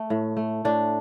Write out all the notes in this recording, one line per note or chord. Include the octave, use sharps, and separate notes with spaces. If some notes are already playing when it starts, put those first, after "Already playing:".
Already playing: A3
A2
A3
A2 D4